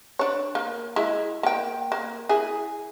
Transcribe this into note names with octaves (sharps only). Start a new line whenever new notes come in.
D4 C#5
A#3
G#3 E4
A#3 G5
A#3
E4 G#4